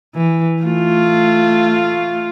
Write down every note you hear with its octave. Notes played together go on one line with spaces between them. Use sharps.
E3
A3 F4